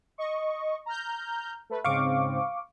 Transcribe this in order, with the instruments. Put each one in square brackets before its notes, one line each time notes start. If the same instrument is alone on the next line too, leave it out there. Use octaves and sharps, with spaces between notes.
[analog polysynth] D#5 C#6
A#5 F6 G6
A3 B4
[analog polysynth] G#2 C#3 C4 [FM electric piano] F5 C#6 D6